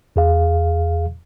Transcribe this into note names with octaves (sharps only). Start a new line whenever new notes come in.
E2 G#4 F5